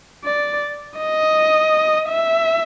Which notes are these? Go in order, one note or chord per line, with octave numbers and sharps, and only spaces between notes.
D5
D#5
E5